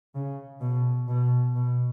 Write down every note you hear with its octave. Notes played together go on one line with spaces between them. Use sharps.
C#3
B2
B2
B2